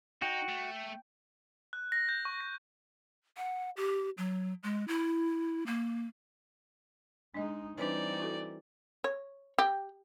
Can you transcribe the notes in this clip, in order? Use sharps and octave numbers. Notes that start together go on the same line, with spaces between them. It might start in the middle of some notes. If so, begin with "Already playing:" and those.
D#4 F#4 G5
A3
F#6
A#6
G6
C#6
A#6
F#5
G4
F#3
G#3
E4
A#3
G#3 D4 D#4 D#5
E3 G3 C4 D4 D#4 B4 C#5 D5
E4 F#4 A4
C#5
G4